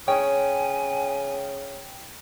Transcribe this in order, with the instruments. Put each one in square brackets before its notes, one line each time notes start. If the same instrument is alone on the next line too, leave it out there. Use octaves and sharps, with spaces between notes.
[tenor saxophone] C#3 [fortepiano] C#5 [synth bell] G5 [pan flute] G#5